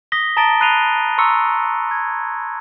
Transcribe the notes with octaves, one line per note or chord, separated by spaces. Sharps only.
D#6 A#6 B6 G7
A5 A#5 D#6 A6 D7 G7
B5 F#6 C7 D#7 F7 G7
A#5 C6 C#6 E6 C#7
G#6